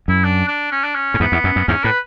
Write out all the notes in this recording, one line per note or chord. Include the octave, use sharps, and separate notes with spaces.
F#2 E4
D4
D4
C#4
D4
C#4
A2
E2 G#2 B3
E2
F#2
F#2
E2 G#2 C#4
A2 B4